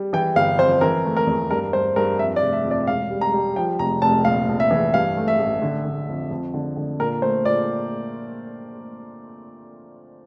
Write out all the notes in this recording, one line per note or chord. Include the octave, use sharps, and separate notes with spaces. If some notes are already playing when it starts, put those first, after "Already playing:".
Already playing: G3
E3 G5
G1 F5
F2 C5
E3 A#4
A3
A#4
E2
G2 A#4
G2 C5
G2 A#4
F2 E5
D5
F1
E5
F2
D5
E1 F5
G3
A#5
G3
F3 G5
F1 A#5
F1 A5
A#1 F5
A#1
E5
E3
G2 F5
A3
E5
A1
D3
D3
F2
F2
D3
D3
A#2 A#4
A3 C5
A#2 D5